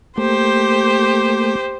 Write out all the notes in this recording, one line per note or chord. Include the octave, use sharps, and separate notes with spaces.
A3 A#3 G4 C5